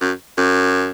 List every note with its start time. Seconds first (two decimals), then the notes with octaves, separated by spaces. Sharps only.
0.01 F#2
0.38 F#2